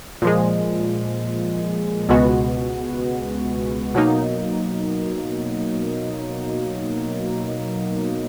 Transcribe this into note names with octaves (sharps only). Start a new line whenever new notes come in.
A#2 F3 G#3
C#2 B2 G#3 B3 F#4
B2 F#3 A#3 D#4